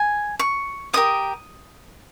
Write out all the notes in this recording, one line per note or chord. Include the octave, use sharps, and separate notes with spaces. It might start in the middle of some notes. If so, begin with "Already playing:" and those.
Already playing: G#5
C#6
G4 A#4 D#5 D#6